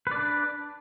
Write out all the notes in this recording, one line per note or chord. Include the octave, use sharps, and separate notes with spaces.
D4 B4 D5